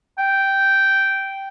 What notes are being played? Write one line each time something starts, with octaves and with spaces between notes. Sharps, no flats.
G5